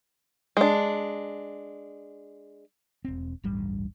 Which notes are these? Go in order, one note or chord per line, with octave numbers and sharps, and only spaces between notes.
G#3 D4
E1 C4
D1 A1 G2 G3